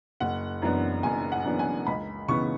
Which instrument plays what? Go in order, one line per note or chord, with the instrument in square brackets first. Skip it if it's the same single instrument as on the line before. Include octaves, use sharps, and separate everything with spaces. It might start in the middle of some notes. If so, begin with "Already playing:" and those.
[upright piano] F#1 F#5
F#2 E3 B3 D4
F#1 G#5
F#5
F#2 E3 B3 D4
G#5
C#2 B5
C#3 E3 B3 C#6